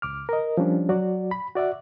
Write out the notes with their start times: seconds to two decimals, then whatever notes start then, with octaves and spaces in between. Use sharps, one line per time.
0.02 C#2 D6 F6
0.29 A#4 D#5
0.57 F3 G3 C#4 D4
0.89 F#3 F#4 D5
1.31 B5
1.55 F#4 D5 E5 F#5